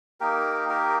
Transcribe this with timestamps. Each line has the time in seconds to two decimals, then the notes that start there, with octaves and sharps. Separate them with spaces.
0.20 A#3 D#4 G4 A#4
0.69 G4 A#4